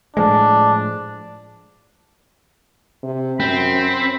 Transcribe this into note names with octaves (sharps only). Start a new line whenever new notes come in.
A2 F3 G#3 D4
C3
F#2 C4 B5